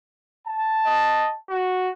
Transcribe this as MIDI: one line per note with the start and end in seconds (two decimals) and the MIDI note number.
0.48 1.37 81
0.86 1.29 75
1.50 1.89 66